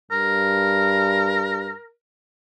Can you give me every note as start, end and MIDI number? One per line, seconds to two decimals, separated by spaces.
0.11 1.72 43
0.11 1.90 70